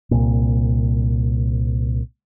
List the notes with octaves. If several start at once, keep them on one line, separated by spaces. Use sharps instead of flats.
C2 A#2